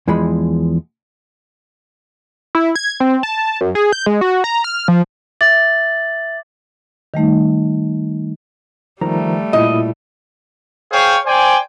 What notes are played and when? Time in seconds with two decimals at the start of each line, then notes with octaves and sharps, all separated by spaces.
0.08 E2 E3 F3 G#3 B5
2.55 E4
2.76 G#6
3.00 C4
3.23 A5
3.61 F#2
3.75 G#4
3.93 G6
4.06 G#3
4.21 F#4
4.44 A#5
4.64 F6
4.88 F3
5.41 E5 D6 A6 F#7
7.14 D#3 G3 A3 D#4
9.01 D#3 F3 G3 A3 A#5
9.53 A#2 E4 D#5
10.92 G#4 C5 C#5 F5 G5
11.26 C5 D5 G5 G#5